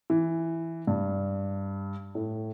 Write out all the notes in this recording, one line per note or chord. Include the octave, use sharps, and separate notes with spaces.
E3
G2
A2